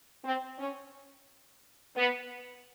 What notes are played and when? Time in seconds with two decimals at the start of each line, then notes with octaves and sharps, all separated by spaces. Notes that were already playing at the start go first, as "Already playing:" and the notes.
0.24 C4
0.58 C#4
1.96 B3